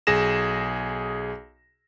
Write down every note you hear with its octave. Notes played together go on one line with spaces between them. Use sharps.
B1 G#4 A#6 E7